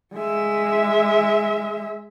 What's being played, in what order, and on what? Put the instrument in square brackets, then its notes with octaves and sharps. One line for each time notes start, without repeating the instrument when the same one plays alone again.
[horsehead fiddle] G#3 E5